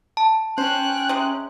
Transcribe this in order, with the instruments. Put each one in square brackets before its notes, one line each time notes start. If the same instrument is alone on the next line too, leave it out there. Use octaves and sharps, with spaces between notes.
[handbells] A5
[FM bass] C#4 [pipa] C5 [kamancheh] G5 F#6
[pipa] C3 G#3